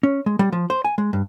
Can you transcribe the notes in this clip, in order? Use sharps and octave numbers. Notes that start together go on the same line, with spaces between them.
C#4
G#3
G3
F3
C5
G#5
G#3
G2